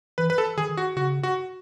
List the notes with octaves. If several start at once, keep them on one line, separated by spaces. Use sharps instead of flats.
E3 B4
B4
A4
D#3 G#4
F#4
C#3 F#4
F#4